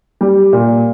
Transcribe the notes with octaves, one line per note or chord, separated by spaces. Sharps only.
G3
A#2